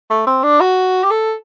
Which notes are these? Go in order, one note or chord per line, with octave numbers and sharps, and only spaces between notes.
A3
C4
D4
F#4
G4
A4